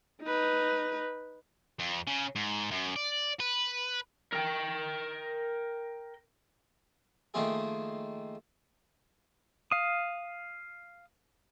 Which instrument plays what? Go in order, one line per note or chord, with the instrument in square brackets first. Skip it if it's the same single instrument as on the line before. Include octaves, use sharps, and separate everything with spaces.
[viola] D#4 B4
[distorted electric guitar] F2
C#3
G#2
F#2
D5
B4
[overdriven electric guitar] A#4 G5
[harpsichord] D#3 F3 A3 A#3 F4 G#4
[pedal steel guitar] F5 D#6